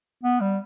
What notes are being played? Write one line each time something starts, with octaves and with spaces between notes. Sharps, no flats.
B3
G3